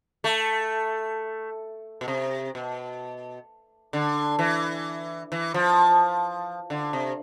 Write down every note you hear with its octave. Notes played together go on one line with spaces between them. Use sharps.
A3
B2
C3
B2
D3
E3
E3
F3
D3
C3